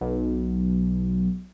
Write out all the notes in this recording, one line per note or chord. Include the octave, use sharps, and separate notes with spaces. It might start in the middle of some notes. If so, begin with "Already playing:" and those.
B1